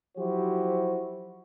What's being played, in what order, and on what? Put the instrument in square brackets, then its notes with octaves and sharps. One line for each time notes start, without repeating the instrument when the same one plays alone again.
[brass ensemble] F3 F#3 E4 F#4 G4 C5